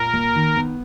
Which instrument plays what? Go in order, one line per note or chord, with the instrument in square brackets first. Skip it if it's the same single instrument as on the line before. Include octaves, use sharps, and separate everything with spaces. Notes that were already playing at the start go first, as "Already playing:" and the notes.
Already playing: [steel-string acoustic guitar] A#2 [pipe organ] A#4
[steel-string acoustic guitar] A#3
D#3
B3